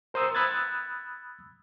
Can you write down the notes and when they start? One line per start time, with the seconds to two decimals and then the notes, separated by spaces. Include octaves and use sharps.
0.14 A#4 C5 A#5 D#6 E6
0.35 B5 D#6 E6 F#6 G#6 A6